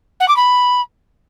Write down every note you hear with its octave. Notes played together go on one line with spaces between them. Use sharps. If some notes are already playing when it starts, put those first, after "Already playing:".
F#5
D6
B5